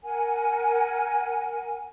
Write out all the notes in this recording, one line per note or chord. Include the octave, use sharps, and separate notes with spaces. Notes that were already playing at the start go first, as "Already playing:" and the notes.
A#4 F#5 G#5